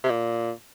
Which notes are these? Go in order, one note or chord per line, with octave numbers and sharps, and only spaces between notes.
C3
A#2